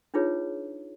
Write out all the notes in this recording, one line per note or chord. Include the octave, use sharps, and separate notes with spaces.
D4 D#4 F4 G#4 B4 C#5